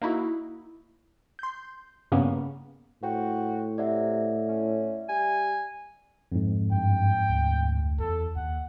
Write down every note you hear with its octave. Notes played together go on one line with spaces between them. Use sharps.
A#3 D#4 E4 F#4
C6 G6
G2 C#3 A#3 B3 C#4
A2 F#4 C5 G5
C3 D5 E5 F#5
C#4
G3 G#5
F2 G#2
G2 G5
D2
E2 A4
D#2 F#5